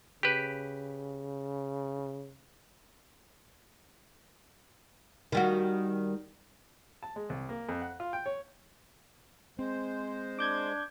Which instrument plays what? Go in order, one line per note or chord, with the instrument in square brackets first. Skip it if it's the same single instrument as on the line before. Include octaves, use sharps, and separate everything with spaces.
[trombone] C#3 [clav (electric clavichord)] G4 B4
[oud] D#3 G3 F#4
[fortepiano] A5
G#3
C2
A#3
F2
F#5
F4
G5
C#5
[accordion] G#3 C5 [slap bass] C4
[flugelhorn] D4 [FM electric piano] D6 G6 G#6